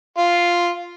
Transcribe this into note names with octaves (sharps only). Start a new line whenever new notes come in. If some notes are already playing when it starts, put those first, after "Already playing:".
F4